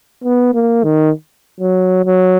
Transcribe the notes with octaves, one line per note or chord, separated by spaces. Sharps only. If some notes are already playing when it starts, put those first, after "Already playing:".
B3
A#3
D#3
F#3
F#3